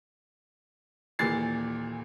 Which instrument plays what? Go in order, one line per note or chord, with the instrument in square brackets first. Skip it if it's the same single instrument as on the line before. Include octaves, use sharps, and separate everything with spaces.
[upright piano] D#1 A#2 E3 A6 C7